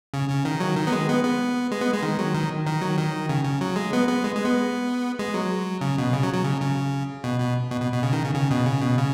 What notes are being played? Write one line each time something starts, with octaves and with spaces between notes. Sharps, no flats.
C#3
C#3
D#3
F#3
D#3
B3
G#3
B3
B3
G#3
B3
G#3
D#3
F#3
D#3
D#3
F#3
D#3
C#3
C#3
F#3
G#3
B3
B3
G#3
G#3
B3
G#3
F#3
C#3
B2
C#3
F#3
F#3
C#3
C#3
B2
B2
B2
B2
B2
C#3
D#3
C#3
C#3
B2
C#3
B2
C#3